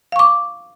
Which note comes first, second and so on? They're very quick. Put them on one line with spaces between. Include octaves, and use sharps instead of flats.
F5 C#6 D6